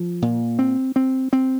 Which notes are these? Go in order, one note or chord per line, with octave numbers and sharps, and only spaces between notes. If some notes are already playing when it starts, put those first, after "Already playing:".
Already playing: F3
A#2
C4
C4
C4